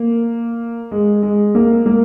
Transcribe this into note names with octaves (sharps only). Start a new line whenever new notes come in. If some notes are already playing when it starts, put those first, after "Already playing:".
Already playing: A#3
G#3
G#3
A#3
A#3